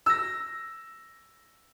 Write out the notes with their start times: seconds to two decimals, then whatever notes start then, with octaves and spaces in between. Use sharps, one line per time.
0.06 E6 A#6